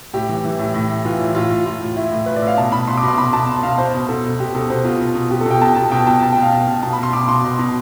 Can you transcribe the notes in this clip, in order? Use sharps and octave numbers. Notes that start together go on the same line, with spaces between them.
A2 G4
E3
E3
A2
A2
A2
E3 F4
A2
A2 F4
A2
A2 F4
A2
A2 E4
A2
A2 B4
D5
A2
F5
B2 A5
B2 B5
B2 C6
D6
B2 C6
B2 B5
B2 A5
B2
B2 F5
B2 C5
B2
B2 A4
B2
B2 G4
B2 A4
B2 C5
B2 F4
B2
B2
B2 G4
A4
B2 G5
B2 A5
B2 A5
B2 G5
B2 A5
B2 A5
B2 G5
F5
B2
B2
B2 A5
B5
B2 C6
B2 D6
B2 C6
B2
B2